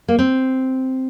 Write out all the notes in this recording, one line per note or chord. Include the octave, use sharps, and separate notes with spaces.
A#3
C4